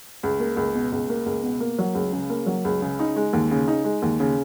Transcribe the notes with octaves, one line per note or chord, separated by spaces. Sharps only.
C#2
A#3
C#2
B2
C#2
A#3
C#2
B2
A#3
F#3
C#2
C#3
A#3
F#3
C#2
C#3
D#4
G#3
D#2
C#3
D#4
G#3
D#2
C#3